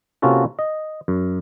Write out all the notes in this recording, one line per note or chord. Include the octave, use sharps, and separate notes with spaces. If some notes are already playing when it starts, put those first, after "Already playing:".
C3 A#3 C#4 F4 F#4 A4
D#5
F#2